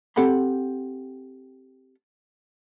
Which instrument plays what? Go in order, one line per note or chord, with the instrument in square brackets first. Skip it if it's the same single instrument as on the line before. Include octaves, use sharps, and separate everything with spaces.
[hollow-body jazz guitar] C4 G4 A4 F#5 B5 C6